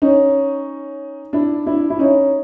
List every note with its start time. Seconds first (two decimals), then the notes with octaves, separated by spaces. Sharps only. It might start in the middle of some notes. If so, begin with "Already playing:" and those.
0.02 C#4 D#4
1.33 D4 E4
1.67 D4 E4
1.90 E4
1.99 C#4 D#4